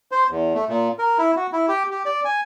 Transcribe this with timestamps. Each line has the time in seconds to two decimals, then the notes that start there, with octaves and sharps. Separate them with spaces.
0.12 C5
0.30 E2
0.55 A3
0.69 A#2
0.99 A#4
1.18 E4
1.37 F#4
1.53 E4
1.68 G4
1.91 G4
2.06 D5
2.25 G#5